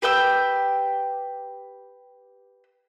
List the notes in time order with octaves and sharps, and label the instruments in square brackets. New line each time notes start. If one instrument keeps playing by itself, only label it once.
[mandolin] G4 B4 G5 E6